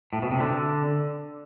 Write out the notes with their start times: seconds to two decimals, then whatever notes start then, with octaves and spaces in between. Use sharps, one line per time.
0.13 A2
0.22 B2
0.31 C3
0.40 D3